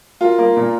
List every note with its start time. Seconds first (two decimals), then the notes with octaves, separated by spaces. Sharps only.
0.21 F4 A#4
0.38 A#3
0.57 A#2